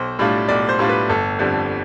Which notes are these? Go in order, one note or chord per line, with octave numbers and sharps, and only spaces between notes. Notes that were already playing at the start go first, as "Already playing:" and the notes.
Already playing: B1 C5
A2 G3 D4 F4
B1 D5
C5
A2 G3 D4 F4
B4
G1 A4
F2 D3 G3